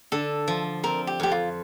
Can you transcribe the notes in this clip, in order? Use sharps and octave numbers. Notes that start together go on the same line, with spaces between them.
D3 A4
F3
C4 A#4
G4
F2 G4
F4